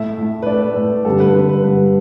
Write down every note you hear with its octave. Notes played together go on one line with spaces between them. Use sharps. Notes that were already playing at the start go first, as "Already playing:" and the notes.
Already playing: A2 A3 E5
A2 A3
B4
A2 A3 D5
B4
A2 A3
G2 D3 G3 A4
B4
G2 D3 G3 B4
B4
G2 D3 G3 B4